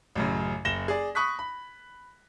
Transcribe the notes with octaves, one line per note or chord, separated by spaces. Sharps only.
A1 F#2 C#3
F#1 A#6 E7 G7
G#4 D5
B5 C#6 D#6 F#6 B6
B5